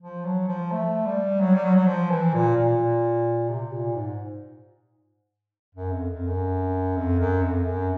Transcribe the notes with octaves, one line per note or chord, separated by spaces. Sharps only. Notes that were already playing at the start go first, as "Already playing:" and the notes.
F3
F#3
F3
A3
G3
F#3
G3
F#3
F#3
F3
E3
A#2
A#2
C3
A#2
G#2
F#2
F2
F2
F#2
F2
F#2
F2
F#2